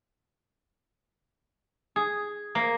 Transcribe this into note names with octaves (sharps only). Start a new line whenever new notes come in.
G#4
A#3